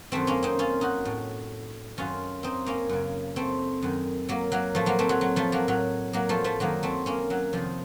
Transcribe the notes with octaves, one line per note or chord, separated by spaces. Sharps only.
F#2 D#3 A3 C4
A#3 C#4
C4 D#4
C#4 F4
D#4 F#4
A2
F#2 D#3 C#4 F4
C4 D#4
A#3 C#4
F#2 C#3
A3 C4
F#2 D#3
F#3 A#3
F#3 A#3
A2 F3 A3
F#3 A#3
A3 C4
F#3
F#3
F3 A3
F#3 A#3
A2 F#3
F#3 A#3
F3 A3
F3 A3
F#2 D#3 F#3 A#3
A3 C4
A#3 C#4
F#3
F2 C3 D#3 F3